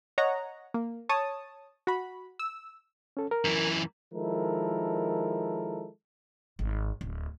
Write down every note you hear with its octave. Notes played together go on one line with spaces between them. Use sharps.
C#5 D#5 F#5 A#5
A#3
C#5 A5 D#6
F#4 B5
E6
C#4 A4
A#4
F#2 E3
D#3 F3 G#3 E4 A4 A#4
G#1
D1